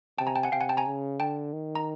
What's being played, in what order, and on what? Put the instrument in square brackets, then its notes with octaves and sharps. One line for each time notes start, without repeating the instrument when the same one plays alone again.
[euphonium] C3 [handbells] G5 A5
[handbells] G#5 A#5
G5 A5
F#5 G#5
[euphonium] C3 [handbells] F5 G5
[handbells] F#5 G#5
G5 A5
G#5 A#5
[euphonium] C#3
[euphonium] D3 [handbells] G5 A5
[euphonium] D#3
[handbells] A#5